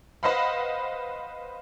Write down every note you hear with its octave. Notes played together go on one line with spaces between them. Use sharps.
B4 C5 D#5 F5 F#5 B5